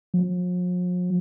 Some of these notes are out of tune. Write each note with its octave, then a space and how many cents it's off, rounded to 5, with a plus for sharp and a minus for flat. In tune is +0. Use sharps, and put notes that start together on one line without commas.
F3 +45